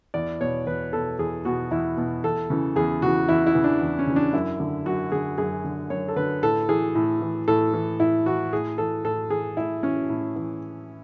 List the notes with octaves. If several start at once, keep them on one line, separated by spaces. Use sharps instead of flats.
E2 D5
B2 C#5
E2 B4
B2 A4
E2 G#4
B2 F#4
E2 E4
B2
E2 A4
C#3 E3
E2 G#4
C#3 E3 F#4
E2 E4
E4
C#3 E3
D4
E2
C#4
C#3 E3
D4
F#2 E4
D3
F#2 F#4
D3 G#4
F#2 G#4
D3
F#2 C#5
A4
D3 B4
A2 A4
E3 G#4
A2
E3
A2 A4
E3
A2 E4
E3 F#4
A2 G#4
E3 A4
A2 A4
E3 G#4
A2 E4
E3 C#4
A2
E3